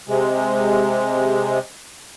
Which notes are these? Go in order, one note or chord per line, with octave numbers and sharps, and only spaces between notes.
C3 G#3